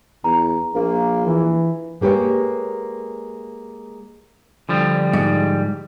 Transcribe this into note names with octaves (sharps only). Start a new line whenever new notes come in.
E2 A#5
A#1 A#3
E3
G#3 A#3 G4 B4 C#5
D3 F3 G3
G#2